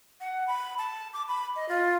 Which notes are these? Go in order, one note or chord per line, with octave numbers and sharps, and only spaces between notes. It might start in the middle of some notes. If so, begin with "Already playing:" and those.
F#5
B5
A5
D6
B5
D#5
F4